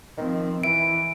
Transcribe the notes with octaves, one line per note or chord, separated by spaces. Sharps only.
D#3 F3 C4
E3 E4 D7